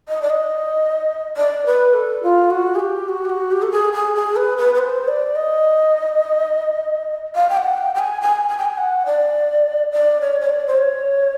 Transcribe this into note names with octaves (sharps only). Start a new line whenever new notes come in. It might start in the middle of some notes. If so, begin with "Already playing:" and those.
D#5
D5
D#5
D5
B4
A4
F4
F#4
G#4
G4
F#4
G4
F#4
G4
A4
G#4
G#4
G#4
B4
B4
B4
C5
D5
D#5
F5
G5
F#5
G5
G5
G#5
G#5
G#5
G5
G#5
F#5
D5
D5
C#5
C#5
D5
C5
C#5